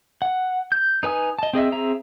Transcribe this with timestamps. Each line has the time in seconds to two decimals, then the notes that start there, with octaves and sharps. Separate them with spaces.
0.22 F#5
0.72 G6
1.03 D#4 B4 G#5 D#6
1.39 D#5 A5
1.53 C4 G#4 D#5 E5
1.72 C4 G#4 E5 A#5